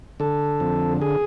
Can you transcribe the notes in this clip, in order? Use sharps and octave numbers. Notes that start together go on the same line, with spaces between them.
D3 A4
F2
G#4